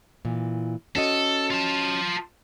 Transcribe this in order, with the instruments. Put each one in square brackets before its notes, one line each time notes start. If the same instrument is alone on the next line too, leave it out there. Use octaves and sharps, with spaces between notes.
[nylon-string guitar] A#2 E3
[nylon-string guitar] C#4 F#4 D#5 [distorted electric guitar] A4
[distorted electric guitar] F4 A5